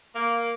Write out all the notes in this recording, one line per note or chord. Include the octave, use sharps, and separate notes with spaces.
A#3